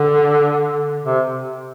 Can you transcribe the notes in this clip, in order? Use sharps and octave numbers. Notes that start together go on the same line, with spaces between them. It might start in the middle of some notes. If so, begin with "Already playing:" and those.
Already playing: D3
C3